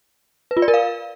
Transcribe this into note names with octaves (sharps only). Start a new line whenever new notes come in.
B4
F4
D5
A#4
F5